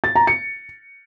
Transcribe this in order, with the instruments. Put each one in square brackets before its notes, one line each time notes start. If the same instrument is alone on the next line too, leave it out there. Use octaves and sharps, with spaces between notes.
[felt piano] A6
A#5
C#7